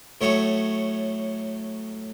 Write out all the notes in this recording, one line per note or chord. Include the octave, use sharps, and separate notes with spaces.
A2 F#3 A3 C#5